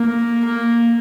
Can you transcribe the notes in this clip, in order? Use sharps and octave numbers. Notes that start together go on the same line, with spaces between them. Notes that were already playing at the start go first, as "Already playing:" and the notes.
Already playing: A#3
A#3